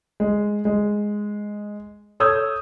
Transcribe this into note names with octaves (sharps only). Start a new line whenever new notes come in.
G#3
G#3
A4 C#5 D#6 E6 G6 G#6